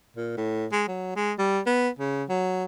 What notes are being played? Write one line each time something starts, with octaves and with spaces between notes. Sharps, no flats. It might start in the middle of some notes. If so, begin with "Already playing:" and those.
A#2
A2
G#3
F#3
G#3
G3
B3
C#3
F#3